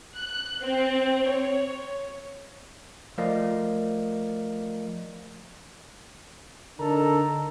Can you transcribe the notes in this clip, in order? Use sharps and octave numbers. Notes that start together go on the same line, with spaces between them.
F#6
C4
C#5
F3 A3 A#4 D5 D#5 F5
D3 D4 D#4 A4 A#4 A#5